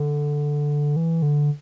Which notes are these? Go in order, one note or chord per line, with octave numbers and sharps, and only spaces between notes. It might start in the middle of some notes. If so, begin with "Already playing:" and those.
Already playing: D3
E3
D3